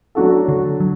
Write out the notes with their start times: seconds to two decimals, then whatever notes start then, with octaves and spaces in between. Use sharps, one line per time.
0.15 F#3 A3 D4 F#4 A4
0.48 D3
0.80 F#3